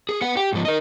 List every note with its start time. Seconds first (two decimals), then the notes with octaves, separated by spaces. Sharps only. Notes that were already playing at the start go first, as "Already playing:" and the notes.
0.09 G#4
0.21 B3 F#5
0.37 G4
0.53 G#2 F3
0.65 A#4 D#5